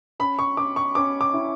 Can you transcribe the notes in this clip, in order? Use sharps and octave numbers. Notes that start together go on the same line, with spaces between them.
C#4 B5
C#6
C#4 D6
C#6
C#4 D6
D6
E4